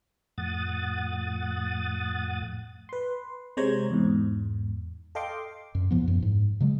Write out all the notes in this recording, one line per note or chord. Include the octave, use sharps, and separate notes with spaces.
F2 A2 F#5 D#6 A6
B4 C6
C3 G#3 C5 C#5 A#5 G#6
E2 G#2
A4 D#5 F5 G5 C6 D6
F#2
D#2 A2 F3 B3
F#2
G#2
C#3 F#3 G#3